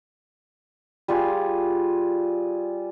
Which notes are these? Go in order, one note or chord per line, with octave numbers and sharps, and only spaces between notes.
G3 F4 G#4